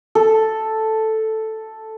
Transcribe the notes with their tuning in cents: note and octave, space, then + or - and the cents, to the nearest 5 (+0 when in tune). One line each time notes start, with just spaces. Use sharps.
A4 +0